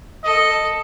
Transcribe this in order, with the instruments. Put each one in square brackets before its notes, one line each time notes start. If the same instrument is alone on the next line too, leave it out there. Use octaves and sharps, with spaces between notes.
[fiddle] A4 [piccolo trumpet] D#5